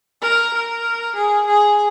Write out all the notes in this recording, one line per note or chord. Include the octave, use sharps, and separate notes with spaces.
A#4
A#4
G#4
G#4